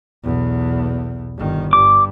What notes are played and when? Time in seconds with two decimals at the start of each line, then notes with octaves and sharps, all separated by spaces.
0.24 B1 E2
1.37 G1 D#3
1.73 G2 D6